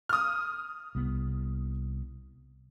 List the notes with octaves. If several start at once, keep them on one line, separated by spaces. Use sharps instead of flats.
D#6 F6
C2 B3